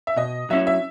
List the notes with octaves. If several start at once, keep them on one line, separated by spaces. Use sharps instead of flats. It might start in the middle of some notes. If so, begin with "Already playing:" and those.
E5
B2 D#5
F#3 C#4 E4 E5
E5